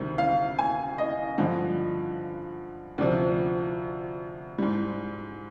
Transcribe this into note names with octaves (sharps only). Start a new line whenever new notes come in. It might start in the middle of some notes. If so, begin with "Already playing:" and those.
Already playing: D2 C3 D#3 G3
F5
G#5
D#5
G2 D3 F3
D2 C3 F3 D5
G#2 G3